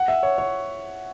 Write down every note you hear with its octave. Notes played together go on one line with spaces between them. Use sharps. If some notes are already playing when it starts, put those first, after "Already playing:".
Already playing: F#5
E5
C#5
C#5